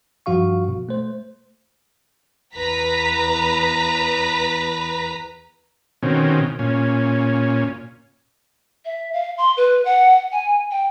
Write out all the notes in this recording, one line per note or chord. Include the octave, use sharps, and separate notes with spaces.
G2 F3 F#4 F5 C#6
B2
A3 C5
E2 B4 A#5 B6
B2 D#3 C4 C#4
A#2 C#4
E5
F5
C6
B4
F#5
G#5
G5